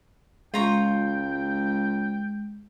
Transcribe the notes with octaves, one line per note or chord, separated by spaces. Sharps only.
C#2 G#3 F4 G5 A#5 C#6